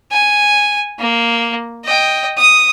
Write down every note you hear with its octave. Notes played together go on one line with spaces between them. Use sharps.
G#5
A#3
D#5 G5
D#6